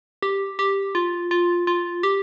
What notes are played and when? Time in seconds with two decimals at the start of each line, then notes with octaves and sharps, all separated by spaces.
0.23 G4
0.59 G4
0.95 F4
1.31 F4
1.67 F4
2.03 G4